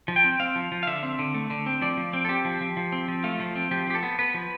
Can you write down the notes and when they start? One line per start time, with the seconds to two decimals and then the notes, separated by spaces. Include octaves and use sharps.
0.08 F3
0.16 G5
0.24 C4
0.40 C4 F5
0.56 F3
0.72 F3
0.83 F5
0.87 D3 E5
1.03 C4
1.19 D3
1.34 A3
1.50 D3
1.66 C4
1.82 F3 D5
1.97 F3
2.13 C4
2.25 A4
2.29 C4 G4
2.45 F3
2.61 F3
2.77 F3
2.92 C4
3.08 F3
3.24 A3 F4
3.40 F3
3.56 C4
3.71 F3 G4
3.87 F3 G4
3.95 A4
4.03 B3
4.19 B3 B4
4.34 F3